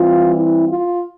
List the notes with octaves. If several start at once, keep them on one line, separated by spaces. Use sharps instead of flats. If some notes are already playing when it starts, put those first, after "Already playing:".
Already playing: E3 G3 C4 F4
E4
F4